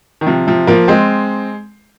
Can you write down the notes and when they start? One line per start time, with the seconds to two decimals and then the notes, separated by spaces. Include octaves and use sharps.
0.21 D#3
0.26 C3 F3
0.47 C3 F3
0.67 F3 A#3
0.88 G#3 C4